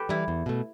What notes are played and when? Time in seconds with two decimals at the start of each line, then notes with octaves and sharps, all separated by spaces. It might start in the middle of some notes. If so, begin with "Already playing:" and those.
Already playing: G4 A4 B4
0.09 E3 G3 E4
0.28 E2
0.46 B2 A3